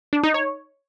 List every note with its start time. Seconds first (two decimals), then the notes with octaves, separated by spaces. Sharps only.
0.13 D4
0.23 D#4
0.34 C#5